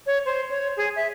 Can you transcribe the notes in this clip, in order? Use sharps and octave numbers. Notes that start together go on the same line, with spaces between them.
C#5
C5
C#5
G#4
E5